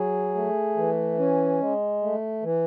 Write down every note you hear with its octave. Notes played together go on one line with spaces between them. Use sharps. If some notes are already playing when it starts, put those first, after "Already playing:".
Already playing: F#3 G#4
A3
E3
C#4
G#3
A3
E3